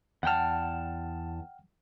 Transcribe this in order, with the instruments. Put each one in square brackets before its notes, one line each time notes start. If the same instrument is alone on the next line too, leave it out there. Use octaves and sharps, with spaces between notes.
[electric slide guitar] E2 A5 [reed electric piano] F#5 G5 F6